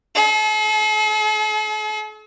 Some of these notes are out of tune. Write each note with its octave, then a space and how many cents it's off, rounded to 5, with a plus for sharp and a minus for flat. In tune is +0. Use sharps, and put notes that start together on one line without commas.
A4 -45